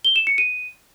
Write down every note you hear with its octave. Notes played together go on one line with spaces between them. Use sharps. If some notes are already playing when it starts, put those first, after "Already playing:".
G7
E7
C#7
D#7